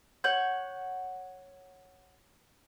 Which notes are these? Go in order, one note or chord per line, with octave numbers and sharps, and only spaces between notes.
C#5 F#5 G6